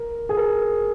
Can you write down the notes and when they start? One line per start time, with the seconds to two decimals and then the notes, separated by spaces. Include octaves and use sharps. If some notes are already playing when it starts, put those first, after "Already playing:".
Already playing: A#4
0.29 G#4
0.37 A#4